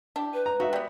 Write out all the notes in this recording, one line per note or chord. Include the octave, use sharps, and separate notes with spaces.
D4 E4 G4
B4
A#5
D#4 F#4 E5
G3 B3